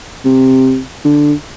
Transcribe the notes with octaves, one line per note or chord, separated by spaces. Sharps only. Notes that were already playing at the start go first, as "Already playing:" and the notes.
C3
D3